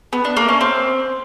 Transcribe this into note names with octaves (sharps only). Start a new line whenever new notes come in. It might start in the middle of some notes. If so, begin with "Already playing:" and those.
B3
D4
A#3
C#4
C4